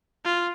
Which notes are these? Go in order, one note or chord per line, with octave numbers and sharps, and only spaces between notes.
F4